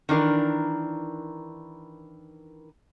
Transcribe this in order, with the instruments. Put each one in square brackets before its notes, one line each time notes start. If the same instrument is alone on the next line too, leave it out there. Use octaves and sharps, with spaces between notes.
[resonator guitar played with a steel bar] D#3 E3 D4 A#4